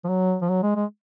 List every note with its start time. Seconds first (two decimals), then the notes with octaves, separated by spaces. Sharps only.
0.04 F3
0.09 F#3
0.42 F3
0.50 F#3
0.63 G#3
0.76 G#3